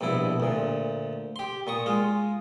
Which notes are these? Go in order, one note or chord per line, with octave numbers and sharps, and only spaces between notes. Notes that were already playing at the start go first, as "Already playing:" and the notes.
A#1 G2 B2 E4
D2 A#2
G4 C6
A#2 C#6 D#6
G#3 F4